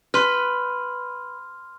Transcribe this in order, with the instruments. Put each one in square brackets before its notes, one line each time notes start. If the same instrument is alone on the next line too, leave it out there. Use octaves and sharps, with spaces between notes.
[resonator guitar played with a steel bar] B4 [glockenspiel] C6 F6